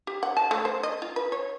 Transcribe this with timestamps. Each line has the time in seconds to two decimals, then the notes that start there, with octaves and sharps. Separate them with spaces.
0.07 G4
0.23 F#5
0.37 A5
0.51 A3
0.65 C5
0.83 D#5
1.02 F4
1.16 B4
1.32 C#5